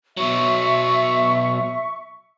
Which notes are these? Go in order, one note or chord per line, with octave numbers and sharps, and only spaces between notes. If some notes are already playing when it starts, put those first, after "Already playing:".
B2 F#3 E5 C#6